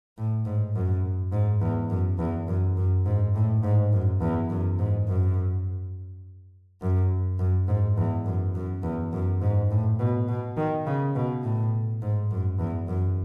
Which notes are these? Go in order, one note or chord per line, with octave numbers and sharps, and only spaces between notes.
A2
G#2
F#2
G#2
E2
F#2
E2
F#2
F#2
G#2
A2
G#2
F#2
E2
F#2
G#2
F#2
F#2
F#2
G#2
E2
F#2
F#2
E2
F#2
G#2
A2
B2
B2
D#3
C#3
B2
A2
G#2
F#2
E2
F#2